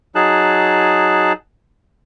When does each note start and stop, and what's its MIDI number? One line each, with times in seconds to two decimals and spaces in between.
0.15 1.32 54
0.15 1.32 63
0.15 1.32 68
0.15 1.32 81
0.15 1.32 90